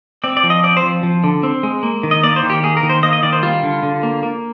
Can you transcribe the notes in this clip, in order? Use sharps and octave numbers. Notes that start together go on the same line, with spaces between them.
C4 D5
D5
F3
D#5
C4 D5
C5
F3
F3
D3
C4
G#3
A#3
D#3
D#5
A#3 D5
C5
D#3
G4
A#3 G#4
A#4
D#3
C5
A#3 D#5
D#5
D#3 D5
C5
G3 F4
D3
D3
A#3
A#3